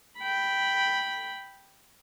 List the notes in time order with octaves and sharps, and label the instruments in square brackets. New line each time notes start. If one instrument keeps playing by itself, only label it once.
[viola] G5 B5